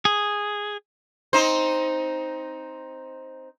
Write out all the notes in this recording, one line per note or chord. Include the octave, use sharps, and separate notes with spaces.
G#4
C4 D#4 C5